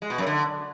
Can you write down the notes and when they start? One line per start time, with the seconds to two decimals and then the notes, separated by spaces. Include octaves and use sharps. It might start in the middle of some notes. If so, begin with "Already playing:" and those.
0.02 G#3
0.10 B2
0.18 F#2
0.26 D3